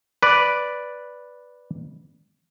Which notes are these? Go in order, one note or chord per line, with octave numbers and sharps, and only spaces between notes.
B4 D5